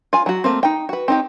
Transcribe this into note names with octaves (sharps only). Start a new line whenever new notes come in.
F4 G#5
F#3 F#4
A3 A#3 C4
D#4 G5
F#4 B4
C4 D#4 G4